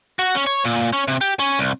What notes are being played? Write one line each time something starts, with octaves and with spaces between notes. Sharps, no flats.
F#4
C#4
C#5
A#2
C#4
C3
G4
C#4
C2